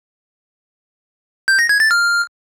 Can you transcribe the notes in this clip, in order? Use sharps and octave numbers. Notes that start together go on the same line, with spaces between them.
G6
A#6
G#6
A6
F6